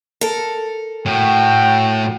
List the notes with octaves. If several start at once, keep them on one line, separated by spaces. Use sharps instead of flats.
A4 A#4
A2 F#4 G5